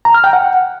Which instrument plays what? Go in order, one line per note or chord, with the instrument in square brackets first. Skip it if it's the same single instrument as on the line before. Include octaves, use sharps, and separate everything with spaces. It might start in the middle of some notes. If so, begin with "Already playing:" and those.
[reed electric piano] A#5
F6
G5
F#5